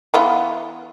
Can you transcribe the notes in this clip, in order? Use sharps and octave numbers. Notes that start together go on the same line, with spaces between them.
E3 B3 F4